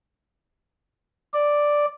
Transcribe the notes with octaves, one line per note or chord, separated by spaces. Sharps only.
D5